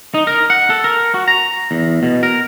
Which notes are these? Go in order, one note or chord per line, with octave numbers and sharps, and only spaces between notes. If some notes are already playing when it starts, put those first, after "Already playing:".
D#4
A#4
F#5
A4
A#4
F#4
A#5
E2
B2
A#4